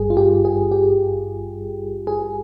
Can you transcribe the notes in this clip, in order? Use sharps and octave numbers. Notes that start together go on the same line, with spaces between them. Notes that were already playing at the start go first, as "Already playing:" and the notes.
Already playing: G#1 G2 G3 G#4
F4
G4
G#4
G4
G#4